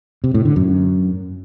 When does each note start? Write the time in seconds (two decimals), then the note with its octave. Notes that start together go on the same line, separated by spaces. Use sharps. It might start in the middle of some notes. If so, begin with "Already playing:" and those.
0.24 C3
0.34 A2
0.45 D3
0.56 F#2